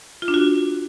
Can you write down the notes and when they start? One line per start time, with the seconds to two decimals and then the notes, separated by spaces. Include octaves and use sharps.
0.22 F4
0.28 D4
0.34 F#4